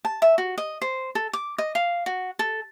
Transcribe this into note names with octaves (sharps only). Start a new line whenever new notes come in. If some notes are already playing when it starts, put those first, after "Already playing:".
A5
E5
F#4
D#5
C5
A4
D6
D#5
F5
F#4
A4